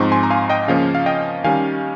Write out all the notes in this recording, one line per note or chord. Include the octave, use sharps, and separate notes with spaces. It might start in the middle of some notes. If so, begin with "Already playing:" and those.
Already playing: G#2 F3 C4 D#4 A#5 C#6
G#5 C6
A#5
F5 G#5
D#5 G5
C#3 F3 A#3 C#4 F5
F5
D#5 G5
D#3 G3 C#4 F5 G#5